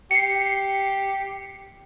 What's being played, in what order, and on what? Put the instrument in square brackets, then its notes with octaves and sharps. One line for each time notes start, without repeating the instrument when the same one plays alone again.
[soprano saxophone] G4 [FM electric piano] C7 C#7